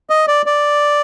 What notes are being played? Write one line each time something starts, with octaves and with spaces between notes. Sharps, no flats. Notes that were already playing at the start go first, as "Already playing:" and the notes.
D#5
D5
D5